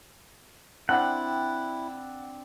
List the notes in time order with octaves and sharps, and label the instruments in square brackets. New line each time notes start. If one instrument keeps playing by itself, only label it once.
[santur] C4 D4 [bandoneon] E4 [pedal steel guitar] F#5